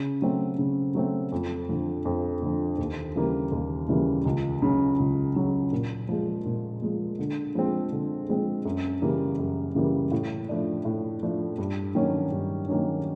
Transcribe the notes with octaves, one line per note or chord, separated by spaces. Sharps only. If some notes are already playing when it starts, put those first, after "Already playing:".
Already playing: C#3
F#3 A3 C4
C#3
F#3 A3 C4
F2
D3 F3
F2
D3 F3
D#2
C#3 E3 G3 A#3
D#2
C#3 E3 G3 A#3
C#2
C#3 F#3
C#2
C#3 F#3
A#2
F3 G#3
A#2
F3 G#3
D3
F3 G#3 C4
D3
F3 G#3 C4
F#2
C#3 E3 G3 A#3
F#2
C#3 E3 G3 A#3
A2
F3 A3 D4
A2
F3 A3 D4
G2
D#3 F#3 A#3 C#4
G2
D#3 F#3 A#3 C#4